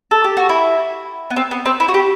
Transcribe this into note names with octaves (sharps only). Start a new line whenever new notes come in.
A4
G4
F#4
E4
B3
C4
B3
C4
E4
F#4
G4